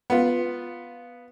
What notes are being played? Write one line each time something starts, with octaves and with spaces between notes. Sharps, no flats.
B3 F4